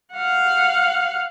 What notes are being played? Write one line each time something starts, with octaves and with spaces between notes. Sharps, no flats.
F5 F#5